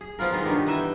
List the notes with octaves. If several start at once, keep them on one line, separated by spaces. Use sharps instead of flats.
G#4
F3 B3 F4 A#4
D#3 G#3 D#4
G2 B3 D#4 G4
E3 D#4 B4 E5
G5